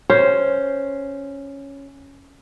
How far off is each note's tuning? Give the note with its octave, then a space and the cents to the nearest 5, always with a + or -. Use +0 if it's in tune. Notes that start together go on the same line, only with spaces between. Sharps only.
C#4 +0 C5 +0